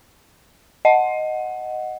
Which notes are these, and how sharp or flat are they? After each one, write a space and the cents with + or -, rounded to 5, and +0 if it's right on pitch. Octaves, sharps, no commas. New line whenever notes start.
D#5 +0 F#5 +0